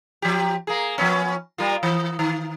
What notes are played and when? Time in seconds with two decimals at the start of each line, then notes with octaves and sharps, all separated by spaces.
0.22 F3 G4
0.67 A#3 G#4
0.98 F3 B3 C#4
1.58 G3 A#3 F4
1.83 E3
2.19 D#3